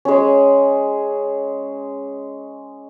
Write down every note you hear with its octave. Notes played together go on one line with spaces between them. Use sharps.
G#3 C#4